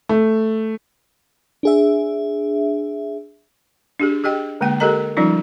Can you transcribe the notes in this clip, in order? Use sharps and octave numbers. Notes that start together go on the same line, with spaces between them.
A3
D4 G#4 E5
D4 G4 G#4
G4 G#4 D#5 G5
D3 G#3 A#3 G5
G4 A4 A#4 D#5 A#5
F3 G3 C#4 D#4 F4